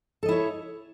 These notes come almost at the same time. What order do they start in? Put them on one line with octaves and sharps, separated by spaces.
A4 D#5 E4 C#5